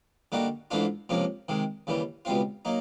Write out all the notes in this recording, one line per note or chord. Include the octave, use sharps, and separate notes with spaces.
D3 G3 A#3 D#4 F#4
G#2 E3 A3 D4 F4
C#2 C3 F3 A#3 C#4
C3 D#3 G#3
D#2 C#3 E3 G3
C#2 B2 G3 C4 F4
F#3 A#3 D#4